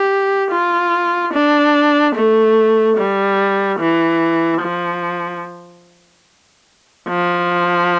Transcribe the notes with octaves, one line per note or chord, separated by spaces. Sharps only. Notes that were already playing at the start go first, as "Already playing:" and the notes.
Already playing: G4
F4
D4
A3
G3
E3
F3
F3